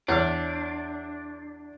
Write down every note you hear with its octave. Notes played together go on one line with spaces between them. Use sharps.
E2 D4 C#5 E5 F6